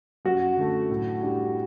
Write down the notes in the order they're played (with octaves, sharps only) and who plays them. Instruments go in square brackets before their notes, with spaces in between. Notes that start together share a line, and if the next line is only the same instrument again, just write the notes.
[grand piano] F#2 [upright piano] F#4
[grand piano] D3 A3
A2
G3 D4 G4